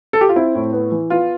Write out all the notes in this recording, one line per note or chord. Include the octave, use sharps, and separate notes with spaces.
A4
G4
F4
C4 E4
A2
B3
E3
B3 F4